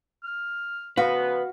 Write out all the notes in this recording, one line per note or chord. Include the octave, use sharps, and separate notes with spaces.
F6
C#3 F3 B3 F#4 B4 F5